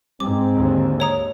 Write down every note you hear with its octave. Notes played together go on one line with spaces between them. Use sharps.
G#2 C4 D6
D#2 D3
C#5 A#5 D#6